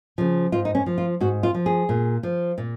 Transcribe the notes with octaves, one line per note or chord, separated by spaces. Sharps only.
C#3 F3
G#2 F4
D#4
C#4
F3
F4
G#2 F#4
F4
F3
G#4
A#2
F3
A#2